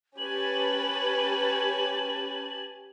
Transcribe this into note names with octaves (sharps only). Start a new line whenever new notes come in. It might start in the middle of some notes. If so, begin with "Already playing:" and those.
C#4 G4 B4 G#5 A5 F#7